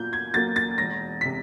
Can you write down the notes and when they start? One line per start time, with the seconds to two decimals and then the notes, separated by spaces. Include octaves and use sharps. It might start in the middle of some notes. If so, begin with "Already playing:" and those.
Already playing: A#2 F#3 A#3 G6
0.13 G#6
0.34 F#3 A#3 A6
0.56 A6
0.78 E1 A#6
1.21 C3 B6